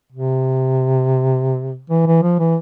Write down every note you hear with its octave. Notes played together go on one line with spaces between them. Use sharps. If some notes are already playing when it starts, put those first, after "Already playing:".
C3
E3
E3
F3
E3